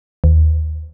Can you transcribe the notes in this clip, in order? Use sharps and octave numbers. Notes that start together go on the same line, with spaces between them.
D#2